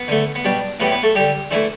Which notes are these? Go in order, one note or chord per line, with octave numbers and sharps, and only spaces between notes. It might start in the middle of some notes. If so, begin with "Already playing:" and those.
Already playing: B3
D3 A3
B3
B2 G3 D4
A2 E3 G3 B3 B4
B3 B4
A3 A4
D3 G3 G4
D3 E3 A3 E4